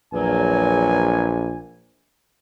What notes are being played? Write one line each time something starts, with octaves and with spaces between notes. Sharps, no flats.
A#1 E2 F#3 G#5